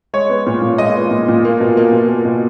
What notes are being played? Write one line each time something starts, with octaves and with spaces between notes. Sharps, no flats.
G#3 C#5
B3
A#2
A#2
G#3 D#5
B3
A#2
A#2
A#3
B2
A#3
B2
A#3
B2